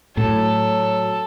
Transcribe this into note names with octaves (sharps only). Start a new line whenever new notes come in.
A2 F#3 A4